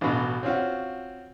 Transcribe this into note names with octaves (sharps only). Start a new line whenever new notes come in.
A1 B2
C4 C#4 F4 F#4